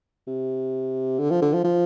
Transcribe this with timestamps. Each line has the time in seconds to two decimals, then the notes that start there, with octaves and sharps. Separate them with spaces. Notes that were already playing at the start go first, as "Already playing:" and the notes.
0.27 C3
1.19 D3
1.31 F3
1.42 D3
1.54 F3
1.64 F3